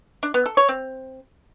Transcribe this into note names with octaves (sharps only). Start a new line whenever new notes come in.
D4
B3
A4
C#5
C4